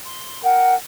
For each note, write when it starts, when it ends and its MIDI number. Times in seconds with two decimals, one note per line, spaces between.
0.05 0.43 84
0.43 0.74 70
0.43 0.74 78
0.43 0.74 79